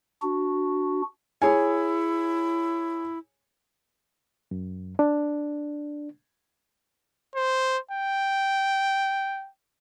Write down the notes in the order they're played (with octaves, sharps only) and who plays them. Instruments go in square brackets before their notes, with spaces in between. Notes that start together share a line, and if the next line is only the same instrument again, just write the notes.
[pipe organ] D4 F#4
[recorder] E4 [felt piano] G#4 C#5 G#5
[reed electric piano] F#2
D4
[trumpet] C5
G5